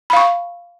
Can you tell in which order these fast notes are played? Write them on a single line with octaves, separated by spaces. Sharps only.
B5 F5 C#6